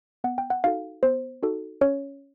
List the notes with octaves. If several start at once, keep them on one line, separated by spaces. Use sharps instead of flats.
B3 F#5
G5
F#5
D#4 F#4 A4 F5
B3 C5
D#4 F#4 A4
C#4 C#5